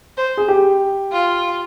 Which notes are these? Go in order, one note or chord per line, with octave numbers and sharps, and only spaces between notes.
C5
G#4
G4
F4